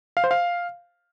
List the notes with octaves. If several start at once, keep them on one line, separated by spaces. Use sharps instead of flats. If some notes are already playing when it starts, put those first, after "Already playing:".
F5
C5
F5